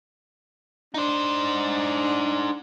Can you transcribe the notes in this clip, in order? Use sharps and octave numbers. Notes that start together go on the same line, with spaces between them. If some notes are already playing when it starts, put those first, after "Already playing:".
D4 D#4 C5